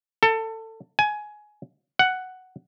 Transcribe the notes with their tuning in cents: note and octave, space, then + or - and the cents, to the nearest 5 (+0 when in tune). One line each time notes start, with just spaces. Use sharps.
A4 +20
G#5 +15
F#5 +5